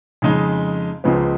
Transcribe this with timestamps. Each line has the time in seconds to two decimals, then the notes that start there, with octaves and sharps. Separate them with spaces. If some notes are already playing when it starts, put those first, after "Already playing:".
0.22 F2 C#3 G#3 D#4
1.04 C#2 C#3 F3 G#3 B3